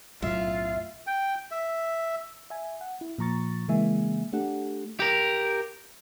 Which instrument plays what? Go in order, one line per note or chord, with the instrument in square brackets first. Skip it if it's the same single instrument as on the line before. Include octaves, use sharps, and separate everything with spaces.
[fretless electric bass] B1 F#2 A2 [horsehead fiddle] F4 [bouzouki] E5
[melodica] G5
E5
[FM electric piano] E5 G#5
F#5
E4
A#2 F3 A#5 C#6 A6
C#3 E3 G#3 A#3 E5 G#5
A3 D4 G4 A4 F#5
[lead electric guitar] G4 A#4